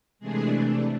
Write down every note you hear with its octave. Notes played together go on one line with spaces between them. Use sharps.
C3 E3 G#3 A3 D4 G#4